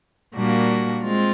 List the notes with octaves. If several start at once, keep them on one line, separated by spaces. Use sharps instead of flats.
A#2 G3 A#3 D4 F#4
G#3 C4 F4